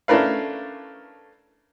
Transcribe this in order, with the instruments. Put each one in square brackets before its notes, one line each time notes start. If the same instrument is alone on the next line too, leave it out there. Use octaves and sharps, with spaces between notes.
[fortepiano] A3 C#4 D4 A#4 B4 F5